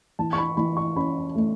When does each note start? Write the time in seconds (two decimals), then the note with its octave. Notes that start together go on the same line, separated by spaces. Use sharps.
0.19 E3 A5
0.33 C#6
0.38 B5
0.57 E3 B5
0.77 C#6
0.96 C#4 B5
1.35 A3